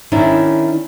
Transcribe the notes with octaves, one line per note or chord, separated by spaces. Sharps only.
D#3 C#4 D4 E4